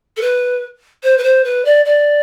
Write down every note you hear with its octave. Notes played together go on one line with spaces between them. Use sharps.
A4
B4
C5
B4
C5
B4
D5
D5